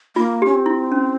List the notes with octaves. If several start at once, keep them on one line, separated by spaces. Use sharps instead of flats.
A#3 F4
C#4 G4
C4
E4
C#4